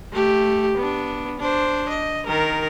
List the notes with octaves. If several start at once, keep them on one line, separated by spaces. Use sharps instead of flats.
A3 G4
B3 D4
D4 C5
D#5
D#3 A#4